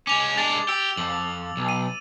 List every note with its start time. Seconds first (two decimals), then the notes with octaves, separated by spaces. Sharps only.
0.07 G#3 C#4 D6 F7
0.37 G#3 D4 A6
0.69 G4 E6
0.97 F2 F#7
1.57 B1
1.69 D#7